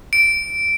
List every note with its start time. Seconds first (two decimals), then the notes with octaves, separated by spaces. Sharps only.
0.13 D7